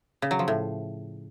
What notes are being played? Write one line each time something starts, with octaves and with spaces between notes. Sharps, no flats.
C#3
F#3
F3
A2